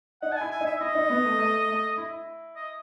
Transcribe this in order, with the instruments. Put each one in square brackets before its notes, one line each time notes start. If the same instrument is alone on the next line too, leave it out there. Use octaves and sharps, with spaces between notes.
[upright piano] D#4 [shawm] F#5
[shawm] A5
[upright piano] E4 [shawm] G#5
[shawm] G#5
[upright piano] D#4 [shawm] E5
[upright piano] E4 [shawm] D#5
[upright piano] D#4
B3
A3
A3
A3
E4
[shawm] D#5